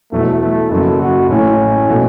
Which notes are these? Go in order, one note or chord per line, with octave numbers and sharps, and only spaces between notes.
E2 B2 F#3 A3
A3
F#1 F#2 F#3 A4
F#4
A1 A2 A3 C#4 E4
B2 A3 F#4